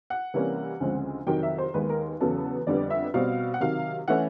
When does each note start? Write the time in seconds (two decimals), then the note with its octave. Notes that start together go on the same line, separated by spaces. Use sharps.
0.10 F#5
0.34 C3 E3 G3 A#3 C#4
0.80 D2 C#3 F3 G#3 C4
1.27 F2 C3 D#3 F#3 G5
1.43 E5
1.58 C5
1.74 D#2 D#3 G#3 B3 B4
1.90 A#4
2.20 E2 C#3 F#3 B3 A4
2.67 F2 D3 G3 B3 D5
2.90 E5
3.14 B2 G3 C4 F5
3.54 F#5
3.61 C3 D#3 F#3 F5
4.08 E3 A3 C#4 F#5